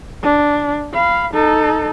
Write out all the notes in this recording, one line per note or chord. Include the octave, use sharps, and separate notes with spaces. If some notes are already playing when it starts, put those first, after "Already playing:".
D4
F5 B5
D#4 A4